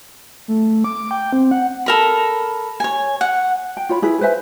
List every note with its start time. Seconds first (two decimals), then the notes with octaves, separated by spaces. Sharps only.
0.48 A3
0.84 D6
1.11 G5
1.33 C4
1.51 F#5
1.86 A4 A#4 B5
2.80 C#5 G#5
3.21 F#5
3.77 G5
3.89 F4 C#5 B5
4.02 E4 G#4 B4
4.21 B4 C5 E5 G#5